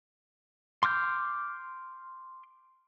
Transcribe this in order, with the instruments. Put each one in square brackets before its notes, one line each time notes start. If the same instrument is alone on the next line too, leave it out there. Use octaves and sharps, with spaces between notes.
[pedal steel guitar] C6 D6 F6 G6